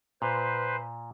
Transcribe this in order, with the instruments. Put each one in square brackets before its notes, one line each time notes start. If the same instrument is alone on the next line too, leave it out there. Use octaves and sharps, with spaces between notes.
[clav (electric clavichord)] A#2 [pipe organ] B4 C5